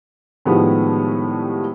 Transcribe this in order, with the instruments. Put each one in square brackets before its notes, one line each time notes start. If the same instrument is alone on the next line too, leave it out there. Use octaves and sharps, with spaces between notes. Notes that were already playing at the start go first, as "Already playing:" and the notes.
[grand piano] A2 D#3 F3 G3 G#3 B3